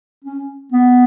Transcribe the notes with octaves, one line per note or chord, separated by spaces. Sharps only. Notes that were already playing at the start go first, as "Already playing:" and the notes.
C#4
B3